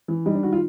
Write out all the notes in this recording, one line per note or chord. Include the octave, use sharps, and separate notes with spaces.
E3
G3 D#4
D4
D#3 F#4
F4